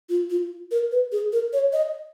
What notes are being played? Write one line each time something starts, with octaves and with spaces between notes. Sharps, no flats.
F4
F4
A#4
B4
G#4
A#4
C#5
D#5